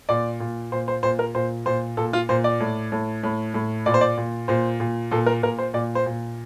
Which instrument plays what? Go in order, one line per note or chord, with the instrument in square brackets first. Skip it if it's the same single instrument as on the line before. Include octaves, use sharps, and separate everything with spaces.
[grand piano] A#2 D5
A#2
A#2 C5
C5
A#2 C5
A#4
A#2 C5
A#2 C5
A#2 A4
F4
A#2 C5
D5
A2
A2
A2
A2
A#2 D5
C5
D5
A#2
A#2 C5
A#2
A#2 A4
A#4
A#2 A#4
C5
A#2 D5
C5
A#2